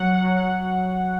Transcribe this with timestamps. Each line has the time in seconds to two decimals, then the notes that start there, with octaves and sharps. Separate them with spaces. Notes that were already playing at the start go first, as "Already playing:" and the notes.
Already playing: F#3 F#5
0.15 F#5
0.22 F#3
0.37 F#5